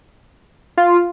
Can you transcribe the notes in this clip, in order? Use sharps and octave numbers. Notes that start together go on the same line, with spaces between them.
F4